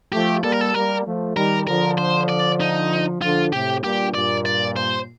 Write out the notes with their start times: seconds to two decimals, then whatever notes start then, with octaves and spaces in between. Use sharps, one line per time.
0.12 F3 A3 G4
0.43 G3 A#3 A4
0.52 A#4
0.61 A4
0.74 G3 A#3 A#4
1.05 F3 A3
1.36 D#3 G3 A#4
1.67 D3 F3 A#4
1.98 C5
2.29 D5
2.60 D#4
3.21 D3 F3 F4
3.53 A2 C3 G4
3.84 G2 A#2 G4
4.14 G2 A#2 D5
4.46 D5
4.77 C5